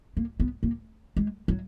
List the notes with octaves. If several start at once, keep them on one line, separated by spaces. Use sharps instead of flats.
A#3
B3
A#3
G#3
F#3